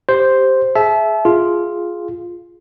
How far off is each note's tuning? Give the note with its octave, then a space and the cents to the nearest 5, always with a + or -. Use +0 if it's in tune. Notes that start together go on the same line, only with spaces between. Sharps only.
G4 +0 C5 +0
G#4 +15 E5 +0 A5 -35
F4 +0 G#4 +0